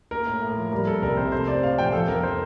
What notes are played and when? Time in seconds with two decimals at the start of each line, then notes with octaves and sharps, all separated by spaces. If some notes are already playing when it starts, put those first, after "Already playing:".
0.11 A#3 A#4
0.27 A2
0.42 A2
0.57 F3
0.72 G3 A#4
0.87 A#3 A4
1.02 C2 A#4
1.17 C3 C5
1.32 A3 C5
1.47 C4 D5
1.63 A2 F5
1.77 F3 G5
1.93 F3 A4
2.08 F2 A#4
2.23 C5